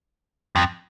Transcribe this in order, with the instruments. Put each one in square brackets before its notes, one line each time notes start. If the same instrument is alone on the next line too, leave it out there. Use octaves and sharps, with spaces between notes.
[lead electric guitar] F2